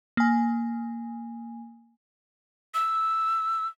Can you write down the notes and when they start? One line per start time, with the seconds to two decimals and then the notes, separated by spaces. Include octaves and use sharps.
0.17 A#3 G#5
2.74 E6